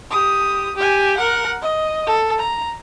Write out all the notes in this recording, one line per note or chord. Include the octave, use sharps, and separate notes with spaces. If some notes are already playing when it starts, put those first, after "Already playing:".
G4 D#6
G4 G#5
A#4 F#5
D#5
A4
A#5